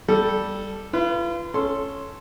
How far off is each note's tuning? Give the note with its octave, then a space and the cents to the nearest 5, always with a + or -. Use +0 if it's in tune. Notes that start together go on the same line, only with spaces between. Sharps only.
G3 +0 A4 +0
F4 -35 B4 +0
C#4 +0 A4 +0 C6 +0